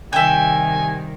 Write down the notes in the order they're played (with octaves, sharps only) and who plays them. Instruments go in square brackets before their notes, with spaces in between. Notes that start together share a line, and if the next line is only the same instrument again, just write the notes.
[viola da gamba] C3 D#3 G3 [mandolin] E5 G5 [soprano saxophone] G#5